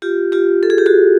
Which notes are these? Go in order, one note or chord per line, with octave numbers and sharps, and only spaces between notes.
F4 G4
F4 G4
A4
G#4
G4
F#4 G#4